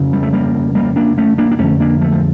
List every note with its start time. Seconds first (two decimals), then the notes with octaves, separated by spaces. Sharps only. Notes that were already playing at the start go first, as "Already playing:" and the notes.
Already playing: F2 C#3
0.13 G3
0.23 A3
0.33 G3 A#3
0.75 G3 A#3
0.96 A#3 D4
1.18 A3 C#4
1.38 A#3 D4
1.51 D4
1.59 F2 D3 A3 C#4
1.80 A#3 D4
2.01 F3 A3
2.12 F3